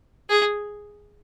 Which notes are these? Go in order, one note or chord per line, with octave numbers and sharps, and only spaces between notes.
G#4